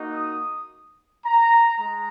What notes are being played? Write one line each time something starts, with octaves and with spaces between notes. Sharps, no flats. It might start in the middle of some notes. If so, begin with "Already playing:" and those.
Already playing: A#3 D#4 F#4
D#6
A#5
G#3 A#5